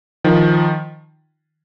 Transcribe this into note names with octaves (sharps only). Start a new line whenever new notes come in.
D#3 F3